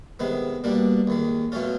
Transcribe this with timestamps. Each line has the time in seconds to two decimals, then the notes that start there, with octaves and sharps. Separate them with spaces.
0.20 C3 D#3 G#3 B3
0.64 B2 G3 A#3 D4
1.07 D#2 D#3 G#3
1.52 B2 F#3 A3 C#4 F4